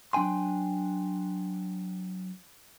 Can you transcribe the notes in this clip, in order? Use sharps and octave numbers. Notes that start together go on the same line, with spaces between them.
F#3 D4 G5 G#5 C6